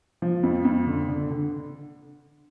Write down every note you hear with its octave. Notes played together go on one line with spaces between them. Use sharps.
F3
F2
F2
D3
D3
D3